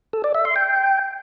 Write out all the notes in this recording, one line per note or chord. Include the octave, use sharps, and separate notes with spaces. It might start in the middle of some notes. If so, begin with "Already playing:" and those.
A4
D5
E5
C6
G5